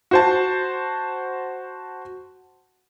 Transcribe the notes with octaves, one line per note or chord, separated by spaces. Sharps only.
F#4 C5 A5